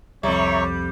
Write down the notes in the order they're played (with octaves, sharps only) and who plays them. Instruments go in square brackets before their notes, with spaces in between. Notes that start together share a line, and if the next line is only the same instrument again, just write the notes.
[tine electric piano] C2 F2 [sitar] G3 [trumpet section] C#5 [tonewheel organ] E5 A#5 C#6